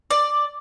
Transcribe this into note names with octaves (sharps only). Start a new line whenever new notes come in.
D5